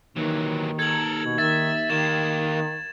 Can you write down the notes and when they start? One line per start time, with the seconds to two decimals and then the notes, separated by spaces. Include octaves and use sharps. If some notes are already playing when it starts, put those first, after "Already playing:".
0.16 D#2 D#3 E3 F#3
0.79 A4 A#4 G#6 F#7
1.25 B2
1.38 D#3 E5 A6
1.90 D#3 A#3 G4 E7